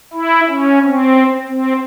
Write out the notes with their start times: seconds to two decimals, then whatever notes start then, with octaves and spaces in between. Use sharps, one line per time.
0.13 E4
0.49 C#4
0.85 C4
1.49 C4